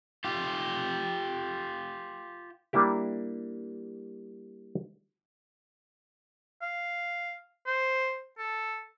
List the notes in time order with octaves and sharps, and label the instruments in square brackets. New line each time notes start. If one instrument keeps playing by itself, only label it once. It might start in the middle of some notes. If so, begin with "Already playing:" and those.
[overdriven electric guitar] F4 G4
[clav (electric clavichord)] G3 A#3 D4 E4 G4
[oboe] F5
C5
A4